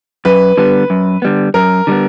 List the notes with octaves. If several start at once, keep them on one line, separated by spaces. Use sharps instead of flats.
F#2 B4
D3 G3 B3
F#2
D3 G3 B3
F#2 A#4
D3 G3 B3